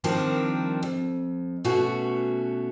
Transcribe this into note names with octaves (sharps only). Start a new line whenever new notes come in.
D#3 F3 G3 C4 D4 A#4
F2
B2 A3 C#4 F#4